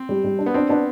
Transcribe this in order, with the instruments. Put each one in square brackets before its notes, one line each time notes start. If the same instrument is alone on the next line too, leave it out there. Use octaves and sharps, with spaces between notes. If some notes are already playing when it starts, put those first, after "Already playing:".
Already playing: [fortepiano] C4
[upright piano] G3
G3
D4
[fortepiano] B3
[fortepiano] C4 [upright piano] D4
[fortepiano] B3 [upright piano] D4